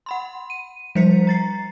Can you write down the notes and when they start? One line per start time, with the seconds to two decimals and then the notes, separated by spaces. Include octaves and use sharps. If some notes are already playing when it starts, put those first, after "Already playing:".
0.06 F#5 B5 C6
0.50 D#7
0.95 F3 G3 C5 B6 C#7
1.27 A#5 A6 C7